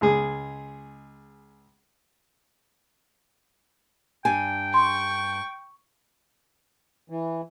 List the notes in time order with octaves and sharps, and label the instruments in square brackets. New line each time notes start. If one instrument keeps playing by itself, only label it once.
[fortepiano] C#2 G#3 G#4
[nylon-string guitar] G2 G#5 [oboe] G5
[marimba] C6 [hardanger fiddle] C#6
[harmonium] E3